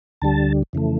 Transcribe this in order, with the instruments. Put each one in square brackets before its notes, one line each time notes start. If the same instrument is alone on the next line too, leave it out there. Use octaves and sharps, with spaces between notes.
[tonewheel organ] D2 D3 G3 A5
F2 C#3 E3 A3